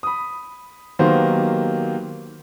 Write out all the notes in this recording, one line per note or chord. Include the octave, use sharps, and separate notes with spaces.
B5 D#6
D#3 F#3 A#3 B3 G4 C5